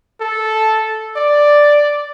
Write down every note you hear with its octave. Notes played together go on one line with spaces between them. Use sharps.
A4
D5